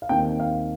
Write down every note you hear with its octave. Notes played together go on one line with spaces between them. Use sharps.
F5
D#2 D#3 C4 G5
F5